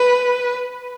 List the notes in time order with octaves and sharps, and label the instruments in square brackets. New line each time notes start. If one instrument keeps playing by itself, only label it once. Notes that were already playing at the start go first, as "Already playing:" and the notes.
Already playing: [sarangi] B4